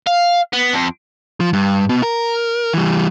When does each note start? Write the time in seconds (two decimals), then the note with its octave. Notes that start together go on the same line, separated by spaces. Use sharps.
0.07 F5
0.53 B3
0.73 F2
1.40 F3
1.53 G2
1.89 B2
2.03 A#4
2.74 E3 G3